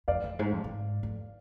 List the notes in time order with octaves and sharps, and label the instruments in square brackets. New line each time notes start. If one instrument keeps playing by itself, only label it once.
[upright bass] F2 [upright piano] D5 F5
[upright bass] F2
G#2
F2
G#2
F2